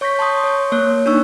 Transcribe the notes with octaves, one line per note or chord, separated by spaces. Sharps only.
C#5 C#6 G6 A#6 B6
A5 C6 C#6 D#6 G6
C#5 C#6
A#3 C#5 F#6
D4 D#4 C#6 E6